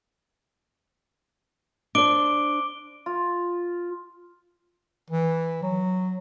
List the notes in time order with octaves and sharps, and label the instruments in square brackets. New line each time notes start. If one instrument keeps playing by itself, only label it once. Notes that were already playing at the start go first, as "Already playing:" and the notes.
[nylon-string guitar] D4 C5 D5 [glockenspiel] D6 D7 G7
[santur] F4
[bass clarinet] E3
F#3